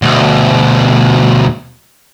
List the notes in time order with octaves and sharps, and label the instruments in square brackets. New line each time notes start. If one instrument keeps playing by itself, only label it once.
[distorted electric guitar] D2 B2